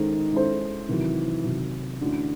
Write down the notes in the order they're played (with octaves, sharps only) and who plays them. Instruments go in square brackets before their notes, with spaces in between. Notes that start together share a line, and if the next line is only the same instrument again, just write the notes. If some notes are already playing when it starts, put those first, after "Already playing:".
Already playing: [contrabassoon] D#3 [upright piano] G#3 C#4 E4 A4 C5
[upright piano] G#3 C#4 E4 A4 C5
[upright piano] C3 D#3 F#3 [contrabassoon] E3
[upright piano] C3 D#3 F#3
[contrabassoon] D3 [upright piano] E3 A3 C#4 F#4